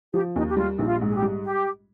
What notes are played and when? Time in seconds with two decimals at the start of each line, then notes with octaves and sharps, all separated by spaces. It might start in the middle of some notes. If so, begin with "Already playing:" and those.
0.14 F3 G4
0.36 D#2 D#4
0.48 G4
0.57 G3 F4
0.79 A#1 D#4
0.86 F4
1.01 G#2
1.09 G#4
1.15 G4
1.22 G3
1.44 G4